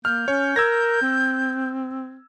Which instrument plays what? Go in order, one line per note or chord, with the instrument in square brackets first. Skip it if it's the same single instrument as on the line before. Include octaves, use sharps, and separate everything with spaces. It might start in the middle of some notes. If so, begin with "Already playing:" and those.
[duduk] A#3 [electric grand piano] F6 [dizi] G6
[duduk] C#4 [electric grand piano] C#5
[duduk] A#4 [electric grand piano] E6 G#6 A#6
[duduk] C4